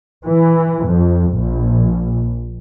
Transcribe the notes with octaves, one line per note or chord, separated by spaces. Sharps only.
E3
F2
A#1